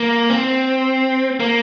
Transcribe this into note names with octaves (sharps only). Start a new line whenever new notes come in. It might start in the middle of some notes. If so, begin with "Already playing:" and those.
Already playing: A#3
C4
A#3